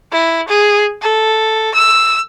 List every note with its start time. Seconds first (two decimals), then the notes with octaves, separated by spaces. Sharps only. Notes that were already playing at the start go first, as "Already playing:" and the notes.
0.11 E4
0.48 G#4
1.02 A4
1.74 E6